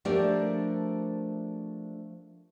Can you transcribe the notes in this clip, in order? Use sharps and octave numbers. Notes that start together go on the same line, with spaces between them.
F3 A3 D4 G4 A#4 D5